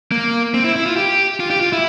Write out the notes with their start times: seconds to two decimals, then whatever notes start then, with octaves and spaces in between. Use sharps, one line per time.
0.12 A#3
0.54 C4
0.64 E4
0.76 E4
0.86 F4
0.96 G4
1.40 F4
1.50 G4
1.61 F4
1.73 E4